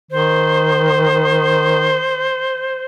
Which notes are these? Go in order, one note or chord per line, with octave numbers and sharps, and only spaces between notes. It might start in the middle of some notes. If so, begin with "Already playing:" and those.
D#3 C5